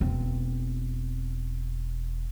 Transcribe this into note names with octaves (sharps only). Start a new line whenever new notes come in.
E1 C4